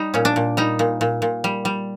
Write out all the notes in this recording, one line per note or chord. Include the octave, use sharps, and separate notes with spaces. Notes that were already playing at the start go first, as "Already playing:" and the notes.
Already playing: G3 D#4
A#2 C#4
D4
A#2
G3 D#4
A#2
A#2
A#2
G3
G3